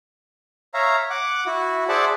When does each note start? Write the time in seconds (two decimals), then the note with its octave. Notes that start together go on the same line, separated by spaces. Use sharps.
0.74 C#5 E5 F5 A#5
1.10 F#5 D6
1.46 E4 F#4
1.89 G#4 C5 D5 E5 F#5 A5